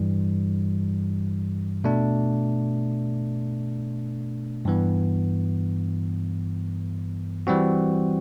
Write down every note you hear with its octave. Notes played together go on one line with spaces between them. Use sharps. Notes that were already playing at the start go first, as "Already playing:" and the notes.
Already playing: G2 E3 G3
B2 A3 D4
G2 E3 B3
E3 G3 C4 F#4